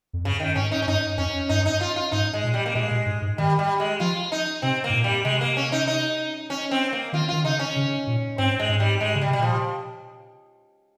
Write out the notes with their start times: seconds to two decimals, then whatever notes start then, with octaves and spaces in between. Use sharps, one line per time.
0.13 F2
0.24 G2 C#3
0.40 D#3
0.55 G#2 C#4
0.72 D#4
0.82 C#4
0.87 G2 D#4
1.18 F2 C#4
1.49 G2 D#4
1.66 D#4
1.81 F4
1.96 F4
2.12 G#2 D#4
2.33 G#3
2.44 A#2
2.54 G3
2.66 A#3
2.75 A#2 G#3
2.91 A#2
3.06 G#2
3.22 G#2
3.38 D#3 G3
3.59 G3
3.80 G#3
4.00 F3 F4
4.32 D#4
4.62 C3 C4
4.84 A#3
4.90 G#2
4.94 A#2
5.04 G3
5.25 C3 G#3
5.41 A#3
5.57 C#4
5.72 D#4
5.88 D#4
6.50 C#4
6.71 C4
6.93 A#3
7.13 D#3 F4
7.29 D#3 F4
7.44 C#3 D#4
7.59 C#4
7.76 C#3
8.07 A#2
8.38 G#2 C4
8.60 G#3
8.69 G#2
8.80 G3
9.01 G#3
9.15 C#3
9.21 G3
9.28 C3
9.33 G3
9.39 A#2 F3